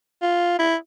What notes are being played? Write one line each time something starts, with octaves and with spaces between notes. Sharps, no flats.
F4
E4